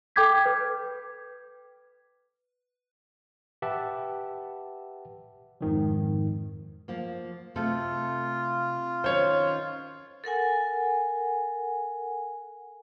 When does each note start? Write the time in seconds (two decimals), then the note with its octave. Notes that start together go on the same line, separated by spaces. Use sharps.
0.16 A4 G5 D6 G6 G#6 B6
0.46 B4
3.62 G4 B4 E5 F#5 A5
5.61 F2 G#2 D#3 F3
6.88 F3 A#3
7.56 C3 A3 F4 A4
9.04 D#3 C#4 C5 C#5
10.24 A4 A#4 F#5 G#5